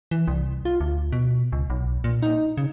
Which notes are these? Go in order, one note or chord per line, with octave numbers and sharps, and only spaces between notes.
E3
C2
F4
D2
B2
C#2
B1
A#2
D#4
C#3